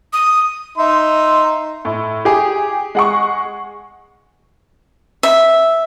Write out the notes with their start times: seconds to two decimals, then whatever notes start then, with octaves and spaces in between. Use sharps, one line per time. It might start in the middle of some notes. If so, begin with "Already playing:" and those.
0.13 D#6
0.78 D#4 E5 C6
1.85 A2
2.25 G4 G#4
2.95 G#3 F#5 C#6
5.23 E5